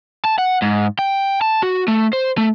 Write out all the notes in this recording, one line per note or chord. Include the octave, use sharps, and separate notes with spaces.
A5
F#5
G#2
G5
A5
F#4
A3
C5
A3